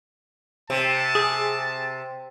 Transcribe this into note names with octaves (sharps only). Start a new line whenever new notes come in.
C3 A5
G#4